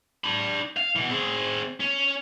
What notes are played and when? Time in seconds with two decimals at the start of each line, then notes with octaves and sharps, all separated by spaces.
0.24 D4 B5
0.77 F5
0.96 B2 E3
1.09 C4 G#4
1.80 C#4